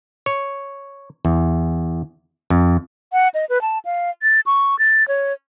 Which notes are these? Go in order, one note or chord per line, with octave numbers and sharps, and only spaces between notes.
C#5
E2
F2
F#5
D#5
B4
A5
F5
A6
C#6
A6
C#5